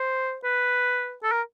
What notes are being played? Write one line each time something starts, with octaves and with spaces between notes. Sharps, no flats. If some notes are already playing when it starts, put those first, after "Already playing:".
Already playing: C5
B4
A4
A#4